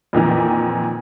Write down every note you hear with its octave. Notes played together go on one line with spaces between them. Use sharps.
F2 A#2 D#3 E3